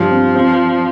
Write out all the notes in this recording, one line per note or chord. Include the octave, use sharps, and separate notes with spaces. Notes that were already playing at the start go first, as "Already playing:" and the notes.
Already playing: G2 F3
C4
C4